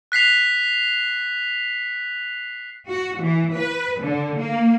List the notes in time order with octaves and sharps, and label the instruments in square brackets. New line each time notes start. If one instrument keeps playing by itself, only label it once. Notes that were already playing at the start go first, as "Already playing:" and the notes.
[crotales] F#6 B6 C7 F7
[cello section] F#4
E3
B4
D3
A#3